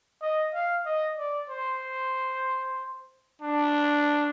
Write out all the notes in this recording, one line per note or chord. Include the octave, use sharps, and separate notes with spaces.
D#5
F5
D#5
D5
C5
D4